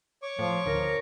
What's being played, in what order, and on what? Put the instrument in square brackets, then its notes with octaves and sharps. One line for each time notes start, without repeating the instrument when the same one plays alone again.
[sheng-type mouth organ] C#5 C#6 D6
[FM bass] A2 [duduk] F3
[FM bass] D2 [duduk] A#4